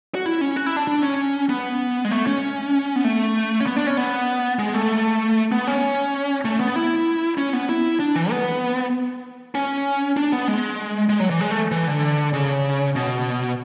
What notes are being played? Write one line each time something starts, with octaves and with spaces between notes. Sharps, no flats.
F#4
E4
C#4
F#4
E4
D4
D4
C#4
B3
G#3
A3
C#4
B3
A3
C#4
B3
D4
C#4
B3
G#3
A3
B3
C#4
A3
B3
E4
C#4
B3
E4
D4
E3
B3
C#4
D4
B3
G#3
G#3
F#3
E3
G#3
A3
E3
D3
C#3
B2